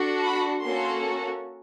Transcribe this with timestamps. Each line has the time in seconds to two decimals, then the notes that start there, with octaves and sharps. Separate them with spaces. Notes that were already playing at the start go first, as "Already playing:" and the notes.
Already playing: D4 F#4 A4
0.25 B5
0.64 A#3 C#4 F#4 A4 C6